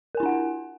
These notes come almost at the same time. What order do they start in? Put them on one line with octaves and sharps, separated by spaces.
A#4 G#5 E4 D4 F#5